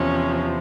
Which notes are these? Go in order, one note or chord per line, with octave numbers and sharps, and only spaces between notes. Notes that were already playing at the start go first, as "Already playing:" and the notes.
Already playing: E2 C3 F3 C#4